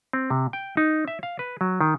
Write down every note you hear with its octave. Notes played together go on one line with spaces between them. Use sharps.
C4
C3
G5
D#4
E5
F5
B4
F#3
D#3